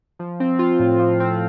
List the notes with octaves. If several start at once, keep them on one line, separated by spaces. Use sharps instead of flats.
F3
C4
F4
A2
F3
C4